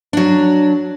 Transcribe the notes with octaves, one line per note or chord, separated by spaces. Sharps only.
F#3 D4